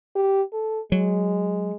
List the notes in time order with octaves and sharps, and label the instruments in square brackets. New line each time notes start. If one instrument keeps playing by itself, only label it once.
[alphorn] G4
A4
[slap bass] F#3 [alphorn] G#3